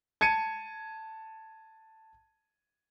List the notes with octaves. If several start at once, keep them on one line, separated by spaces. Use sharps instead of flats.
A5 G#6 C#7 D#7